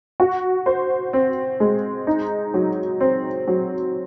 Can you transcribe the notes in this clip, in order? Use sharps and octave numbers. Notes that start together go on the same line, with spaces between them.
F#4
C5
C4
G#3
D#4
F#3
C4
F#3